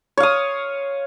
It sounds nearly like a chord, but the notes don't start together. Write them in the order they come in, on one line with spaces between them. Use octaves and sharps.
C#5 F5 D#6